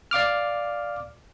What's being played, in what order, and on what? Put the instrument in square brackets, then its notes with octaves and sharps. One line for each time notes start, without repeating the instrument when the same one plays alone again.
[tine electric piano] D5 F5 D6 F6